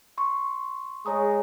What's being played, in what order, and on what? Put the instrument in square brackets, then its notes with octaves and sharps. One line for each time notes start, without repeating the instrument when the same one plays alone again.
[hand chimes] C6 C#6
[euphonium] G#3 [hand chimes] C#5 A#5 D#6